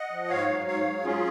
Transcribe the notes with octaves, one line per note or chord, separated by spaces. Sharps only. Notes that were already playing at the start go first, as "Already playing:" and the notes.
Already playing: D#5 F#5
F3
G#2 C#5 F5
F#3
G#2 C#5 F5
F#3
C#4 F4 G#4